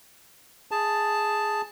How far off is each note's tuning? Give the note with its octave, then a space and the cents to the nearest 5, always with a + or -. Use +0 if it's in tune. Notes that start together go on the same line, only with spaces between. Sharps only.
G#4 +0 A5 +0